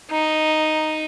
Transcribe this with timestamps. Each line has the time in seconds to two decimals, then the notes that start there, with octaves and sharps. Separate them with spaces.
0.11 D#4